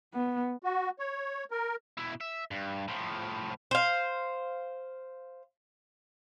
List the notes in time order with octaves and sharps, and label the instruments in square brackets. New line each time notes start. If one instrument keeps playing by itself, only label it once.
[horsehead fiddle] B3
[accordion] F#4
C#5
A#4
[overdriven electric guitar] B2 E4
E5
G2
A2 F3
[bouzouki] C5 F5